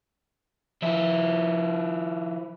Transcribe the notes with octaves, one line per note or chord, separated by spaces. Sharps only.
F3 E4